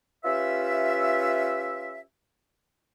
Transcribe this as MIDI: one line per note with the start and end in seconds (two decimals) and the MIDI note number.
0.25 2.00 61
0.25 2.00 65
0.25 2.00 67
0.25 2.00 71
0.25 2.00 76